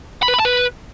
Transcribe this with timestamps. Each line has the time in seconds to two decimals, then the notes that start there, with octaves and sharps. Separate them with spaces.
0.23 B5
0.28 B4
0.34 B5
0.39 A5
0.45 B4